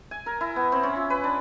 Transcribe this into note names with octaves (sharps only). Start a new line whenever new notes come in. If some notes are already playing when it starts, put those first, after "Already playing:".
G#5
A#4
E4
B3
C4
C#4
F4
B4
D4